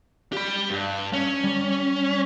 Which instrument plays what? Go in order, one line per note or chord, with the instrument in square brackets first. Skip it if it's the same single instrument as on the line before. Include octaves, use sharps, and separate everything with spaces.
[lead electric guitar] G4 B5
G2
C#4
[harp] G3